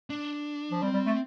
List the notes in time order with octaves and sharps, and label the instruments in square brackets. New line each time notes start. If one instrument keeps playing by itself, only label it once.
[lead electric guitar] D4
[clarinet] F3
[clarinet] G3 [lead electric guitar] C4
[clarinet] G3
A3